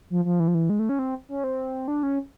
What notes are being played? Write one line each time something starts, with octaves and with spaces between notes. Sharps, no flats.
F3
F3
E3
F3
E3
G#3
A3
C#4
C4
C#4
C4
D4
C#4